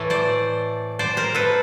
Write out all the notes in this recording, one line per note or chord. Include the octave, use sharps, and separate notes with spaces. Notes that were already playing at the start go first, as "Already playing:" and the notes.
Already playing: A2 E3 A3
C5 D5
C5 D5
A#4 C5
A4 B4